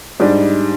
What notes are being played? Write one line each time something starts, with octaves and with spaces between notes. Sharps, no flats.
G#2 G3 D4